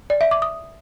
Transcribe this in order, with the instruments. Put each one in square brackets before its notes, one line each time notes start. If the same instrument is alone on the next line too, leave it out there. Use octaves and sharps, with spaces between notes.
[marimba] D5
E5
D6
D#6